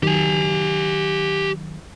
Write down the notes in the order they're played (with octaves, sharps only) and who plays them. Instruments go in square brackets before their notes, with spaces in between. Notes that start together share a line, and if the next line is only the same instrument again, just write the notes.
[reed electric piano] D#3 F#3 [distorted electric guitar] G4 G#5